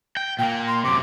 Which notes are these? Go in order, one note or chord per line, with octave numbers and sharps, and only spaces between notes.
G5
A#2 A#3 G5
C6
F#2 C3 D6